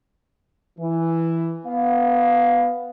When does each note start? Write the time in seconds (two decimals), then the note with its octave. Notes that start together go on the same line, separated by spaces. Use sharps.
0.79 E3
1.66 B3 F5